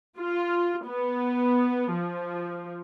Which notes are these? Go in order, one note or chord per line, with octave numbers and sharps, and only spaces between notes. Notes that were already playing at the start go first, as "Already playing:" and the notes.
F4
B3
F3